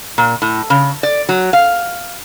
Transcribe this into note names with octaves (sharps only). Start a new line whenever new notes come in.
A#2
A2
C#3
D5
F#3
F5